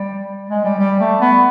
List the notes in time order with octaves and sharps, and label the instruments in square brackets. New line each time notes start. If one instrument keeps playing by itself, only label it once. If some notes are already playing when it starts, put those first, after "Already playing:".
Already playing: [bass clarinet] G3
G#3
G3
G3
A3
B3